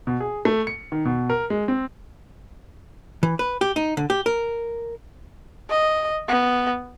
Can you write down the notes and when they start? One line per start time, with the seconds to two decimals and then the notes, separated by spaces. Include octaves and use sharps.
0.07 B2
0.20 G#4
0.45 A3
0.67 C#7
0.92 D#3
1.05 B2
1.30 A#4
1.50 G#3
1.68 C4
3.23 E3
3.39 B4
3.61 G4
3.76 D#4
3.97 D3
4.10 G4
4.26 A#4
5.70 D#5
6.28 B3